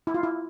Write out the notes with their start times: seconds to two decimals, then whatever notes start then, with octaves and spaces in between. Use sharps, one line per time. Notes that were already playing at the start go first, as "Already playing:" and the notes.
0.07 E4
0.14 F4
0.23 E4